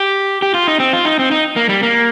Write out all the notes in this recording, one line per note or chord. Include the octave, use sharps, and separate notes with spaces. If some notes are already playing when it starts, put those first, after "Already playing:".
Already playing: G4
G4
F4
D#4
C4
F4
D#4
C4
D#4
A#3
G3
A#3